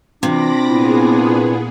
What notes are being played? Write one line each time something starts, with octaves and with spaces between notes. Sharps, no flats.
C3 E3 D4 F4 B5 D6 A#6
A#2 B3 E4 G#4